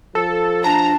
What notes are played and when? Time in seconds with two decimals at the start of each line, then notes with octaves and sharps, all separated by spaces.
0.15 F3 A4
0.64 D4 A5 A#5